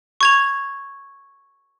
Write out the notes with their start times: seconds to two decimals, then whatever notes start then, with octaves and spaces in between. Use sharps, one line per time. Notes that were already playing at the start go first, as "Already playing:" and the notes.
0.21 C#6 G#6 F7